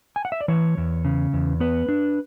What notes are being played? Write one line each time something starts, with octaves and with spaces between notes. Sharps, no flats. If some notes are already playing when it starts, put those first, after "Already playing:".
G#5
F#5
E5
D5
E3 C#5
E2
C#3
E2
B3 B4
D4